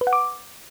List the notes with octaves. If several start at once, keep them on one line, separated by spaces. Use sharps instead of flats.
B4
F#5
D6